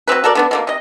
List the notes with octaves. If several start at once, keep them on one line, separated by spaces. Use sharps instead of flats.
F#3 G#3 C4 B4
F#4 A4 A#4 D5
D3 B3 D4
B2 D3 A#3
C3 D#5